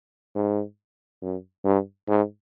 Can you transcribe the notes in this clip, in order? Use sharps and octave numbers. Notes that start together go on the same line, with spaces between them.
G#2
F#2
G2
G#2